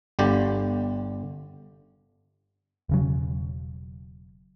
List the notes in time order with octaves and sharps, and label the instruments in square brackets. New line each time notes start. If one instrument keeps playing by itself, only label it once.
[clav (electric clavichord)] G1 D3 G4
[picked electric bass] E1 C#3 F#3